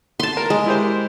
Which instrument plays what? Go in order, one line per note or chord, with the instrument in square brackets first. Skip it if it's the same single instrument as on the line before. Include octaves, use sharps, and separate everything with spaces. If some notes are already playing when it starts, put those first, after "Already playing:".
[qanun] A5 C6
[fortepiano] A#4
[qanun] G#3
[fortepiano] E4 G4 C5